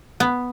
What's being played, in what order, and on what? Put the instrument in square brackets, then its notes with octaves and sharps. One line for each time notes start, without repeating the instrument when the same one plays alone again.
[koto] B3